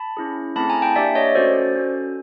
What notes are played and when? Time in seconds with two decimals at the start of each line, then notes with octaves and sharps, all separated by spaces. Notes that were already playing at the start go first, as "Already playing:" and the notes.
Already playing: A5 B5
0.17 C#4 E4 G#4
0.56 A3 C4 E4 G#4 A5 B5
0.70 G#5 A#5
0.82 G5 A5
0.96 A#3 D4 G4 D5 E5
1.15 C#5 D#5
1.35 A3 C#4 F#4 A4 C5 D5
1.75 C#4 F#4 A4